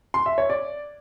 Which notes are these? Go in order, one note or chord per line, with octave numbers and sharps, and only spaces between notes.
C6
E5
C#5
D5